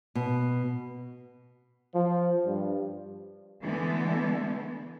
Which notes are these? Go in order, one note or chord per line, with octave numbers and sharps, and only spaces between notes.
B2
F3
G2
D3 E3 G#3 A3 B3